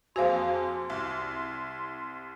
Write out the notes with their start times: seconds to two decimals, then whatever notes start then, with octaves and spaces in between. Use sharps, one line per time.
0.16 F2 A#3 F#4 G#4 C5 F5 C6
0.90 C2